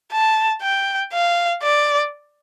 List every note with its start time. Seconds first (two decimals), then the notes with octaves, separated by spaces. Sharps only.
0.12 A5
0.62 G5
1.13 F5
1.63 D5